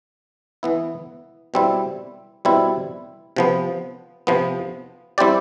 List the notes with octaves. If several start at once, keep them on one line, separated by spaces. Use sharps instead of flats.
E3 B3 E4
B2 G3 C4 E4
B2 G3 C4 E4
C3 F3 B3
C3 F3 B3
G3 C4 E4 G4 D5